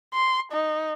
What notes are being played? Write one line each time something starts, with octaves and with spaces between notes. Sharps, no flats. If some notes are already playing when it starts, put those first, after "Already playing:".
C6
D#4